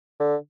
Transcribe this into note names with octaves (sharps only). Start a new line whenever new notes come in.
D3